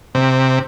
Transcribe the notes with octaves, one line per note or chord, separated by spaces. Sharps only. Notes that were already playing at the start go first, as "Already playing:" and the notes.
C3